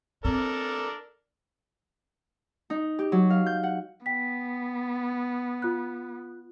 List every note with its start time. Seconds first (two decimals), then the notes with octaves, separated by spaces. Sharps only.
0.25 C4 D4 A4 A#4
2.70 D#4
2.99 G4
3.12 F#3
3.30 F5
3.46 G6
3.63 F#5
4.06 B3 G5 B6
5.62 F4 F#6